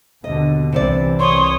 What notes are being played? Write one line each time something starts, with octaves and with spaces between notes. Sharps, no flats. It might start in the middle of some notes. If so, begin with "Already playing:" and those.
D#2 B2 D3 D#5
C2 C3 E3 C5 D5
C#5 C6 D#6